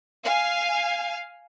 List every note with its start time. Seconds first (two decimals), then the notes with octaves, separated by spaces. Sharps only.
0.25 F5 G#5